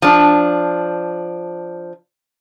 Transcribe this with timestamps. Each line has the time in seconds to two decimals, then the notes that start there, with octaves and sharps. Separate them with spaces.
0.02 F3 D4